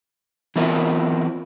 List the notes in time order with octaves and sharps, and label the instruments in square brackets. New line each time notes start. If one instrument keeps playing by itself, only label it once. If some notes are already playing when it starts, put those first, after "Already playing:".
[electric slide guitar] E3 B3 C4 E4 F4 A#4